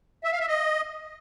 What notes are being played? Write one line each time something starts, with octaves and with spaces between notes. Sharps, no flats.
E5
F5
E5
D#5